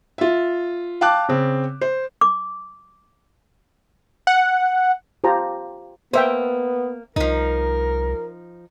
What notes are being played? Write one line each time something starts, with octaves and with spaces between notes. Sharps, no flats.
F4 E5
F5 G5 A5 D6 F#6
C#3 C4
C5
D6
F#5
F4 G4 C5 A5 A#5
A#3 B3 C5 E5 G5
C2 F3 D#4 A#4